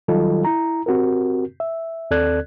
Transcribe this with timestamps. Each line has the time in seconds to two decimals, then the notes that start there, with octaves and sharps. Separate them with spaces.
0.08 D#3 F#3 G3 F4 A4 D#5
0.45 E4 A#5
0.86 C4 F#4 G4 A#4
1.60 E5
2.11 D#2 C4 A4 D5 F#6 G#6